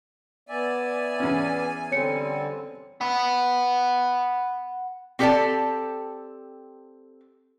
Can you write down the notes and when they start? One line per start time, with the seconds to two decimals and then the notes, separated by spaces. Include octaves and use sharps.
0.49 B3 D5 E5 G#5
1.20 E2 C#4
1.92 D3 G3 C4 C#5 C#7
3.01 F#5 B5
5.19 C4 G4 A4 C5 D5 A5